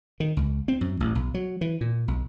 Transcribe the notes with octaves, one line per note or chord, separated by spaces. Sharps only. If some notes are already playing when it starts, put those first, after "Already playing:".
D#3
C#2
C4
F#2
A1
B1
F#3
E3
A#2
B1